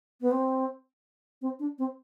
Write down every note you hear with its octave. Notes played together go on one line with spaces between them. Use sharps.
B3
C4
C4
D4
C4